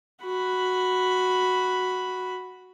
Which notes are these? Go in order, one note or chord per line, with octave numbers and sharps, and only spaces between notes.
F#4 B5